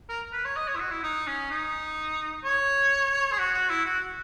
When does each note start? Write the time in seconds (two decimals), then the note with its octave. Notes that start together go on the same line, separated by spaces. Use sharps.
0.09 A#4
0.33 B4
0.45 C#5
0.56 D#5
0.68 C#5
0.75 E4
0.80 F#4
0.91 E4
1.03 D#4
1.27 C#4
1.50 D#4
2.44 C#5
3.32 G#4
3.39 F#4
3.54 F#4
3.70 E4
3.85 F#4